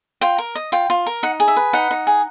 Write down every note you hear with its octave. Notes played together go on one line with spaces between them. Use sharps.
F4 G5
A#4
D#5
F4 G5
F4
A#4
D#4 F#5
G#4
E5
B4
D#4 F#5
D#4
G#4